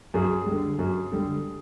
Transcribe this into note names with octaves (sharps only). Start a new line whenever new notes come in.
F#2 G#4
D3 G3
F#2
D3 G3